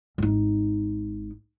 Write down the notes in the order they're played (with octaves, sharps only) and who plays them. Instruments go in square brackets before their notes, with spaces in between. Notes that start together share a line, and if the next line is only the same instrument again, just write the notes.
[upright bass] G#1 D#4